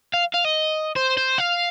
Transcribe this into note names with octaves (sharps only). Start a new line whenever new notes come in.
F5
F5
D#5
C5
C5
F5